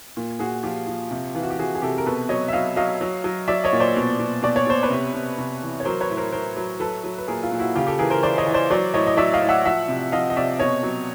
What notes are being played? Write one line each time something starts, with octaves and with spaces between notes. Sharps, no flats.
A#2
A#2 F#4 G#4
F3 F4 G4
F3
C3
E3 F4
F#4
G4
E3 F#4 G#4
G#4
C3 G4 A4
A#4
B2 A4 B4
F#3 C#5 D#5
E5
F#3 D#5 F5
F#3 D#5 F5
F#3
F#3
F#3 D5 E5
C#5 D#5
A#2
C5 D5
B2
B2
B2 D5
C#5
B2 C5
B4 C#5
C3
C3
C3
E3
C#5
F#3 A#4 C5
B4 C#5
A2
A#4 C5
A2 A#4 C5
F#3
F#3 A4 B4
F#3
B4
A#2 G#4 A#4
F4
A#2
E4 F#4
C#3 F4 G4
G4 A4
E3 G#4 A#4
A#4 C5
E3 C5 D5
C#5 D#5
E3
C5 D5
F#3 C5 D5
A2 C#5 D#5
D#5
F#3 D5 E5
D#5 F5
A2
E5 F#5
F3 E5 F#5
C3
F3 D#5 F5
D#5
C3 D5 E5
B2 C#5 D#5
F#3